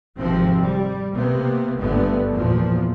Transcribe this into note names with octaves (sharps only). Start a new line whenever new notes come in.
G#1 F2 C3 F3 C4
G3
C3 A#3 B3
G1 G2 D3 A3 B3
E2 A#2 F3